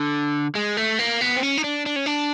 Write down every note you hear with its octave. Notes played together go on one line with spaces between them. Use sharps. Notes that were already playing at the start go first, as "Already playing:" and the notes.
Already playing: D3
G#3
A3
A#3
B3
C4
C#4
D#4
D4
D4
C#4
D4